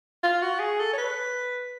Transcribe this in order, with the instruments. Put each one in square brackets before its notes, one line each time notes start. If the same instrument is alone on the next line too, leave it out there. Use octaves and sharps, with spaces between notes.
[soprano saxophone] F4
F#4
G#4
A4
C#5
B4